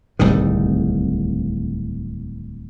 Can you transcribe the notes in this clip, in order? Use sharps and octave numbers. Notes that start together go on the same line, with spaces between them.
D1 C2 A2 D#3